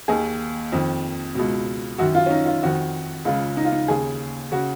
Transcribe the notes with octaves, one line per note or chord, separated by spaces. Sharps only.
D#2 D#3 G#4
F2 D#3
C#2 B2
F#2 D#3 F#4
F4
C#4
D#4
F4
F2 D#3 F#4
C#2 C#3 F4
D#4
F4
D#4
D#2 C#3 G#4
C#3 F#4